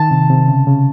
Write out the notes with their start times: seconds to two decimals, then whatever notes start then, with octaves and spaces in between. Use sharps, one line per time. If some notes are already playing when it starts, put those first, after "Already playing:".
Already playing: D#3 A5
0.11 C3
0.30 C3
0.48 C#3
0.67 C#3